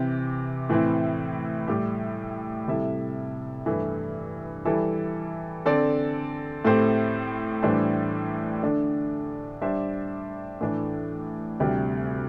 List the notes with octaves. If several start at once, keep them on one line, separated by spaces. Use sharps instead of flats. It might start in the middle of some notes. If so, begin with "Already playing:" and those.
Already playing: C3 E3 C4 G4
A2 E3 C4 E4
A2 G3 E4 G4
C3 G3 E4 A4 E5
G2 E3 A3 E4
E3 G3 E4 A4
D3 C4 A4 D5
A2 A3 C4 G4 C5
A2 E3 G3 D4 C5
D3 A3 D4
G3 D4 C5 E5
A2 E3 A3 D4
D2 C3 G3